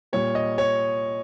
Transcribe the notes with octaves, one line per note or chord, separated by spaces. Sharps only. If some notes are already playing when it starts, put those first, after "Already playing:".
A#2 G3 A#3 C#5
D#5
C#5